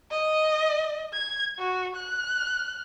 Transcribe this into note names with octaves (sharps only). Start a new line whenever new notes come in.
D#5
G#6
F#4
F#6